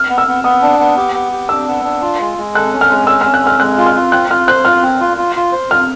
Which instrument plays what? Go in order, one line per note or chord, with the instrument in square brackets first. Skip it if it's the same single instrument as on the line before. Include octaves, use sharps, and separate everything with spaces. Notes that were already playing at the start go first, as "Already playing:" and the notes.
Already playing: [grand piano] F6
[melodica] B3
[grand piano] E6
[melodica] B3
[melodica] B3 [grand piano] D#6
[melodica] D4
B3
G4
B3
G4
[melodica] D4 [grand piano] E6
[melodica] B3
D4
F4
G#3
G#3
[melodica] A4 [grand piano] F#6
[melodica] C#4
[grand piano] F6
[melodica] G#3
[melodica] C#4 [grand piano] E6
[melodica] C#4 [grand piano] F6
[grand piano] F#6
[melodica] G#3 [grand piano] F6
[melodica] G#3 [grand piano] F#6
[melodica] F4
[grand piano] F6
[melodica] F4
[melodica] C4 [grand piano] F#6
[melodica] F4 [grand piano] F6
[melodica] C5 [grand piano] F#6
[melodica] F4 [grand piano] F6
[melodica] C4
F4
F4
F4
C5
[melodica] F4 [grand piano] F6